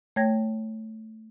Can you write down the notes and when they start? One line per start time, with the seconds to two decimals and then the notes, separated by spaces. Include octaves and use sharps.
0.16 A3 C#5 G5 G#6 A#6